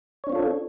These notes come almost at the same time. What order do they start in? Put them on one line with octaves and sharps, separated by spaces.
C#5 D4 C4 F4 A4